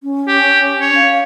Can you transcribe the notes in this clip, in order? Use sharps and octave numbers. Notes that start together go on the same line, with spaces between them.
C#4
G4
C#5
F5